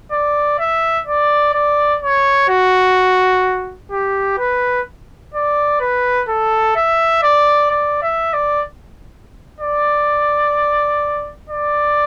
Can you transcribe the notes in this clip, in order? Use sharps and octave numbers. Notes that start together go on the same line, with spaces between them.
D5
E5
D5
D5
C#5
F#4
G4
B4
D5
B4
A4
E5
D5
D5
E5
D5
D5
D5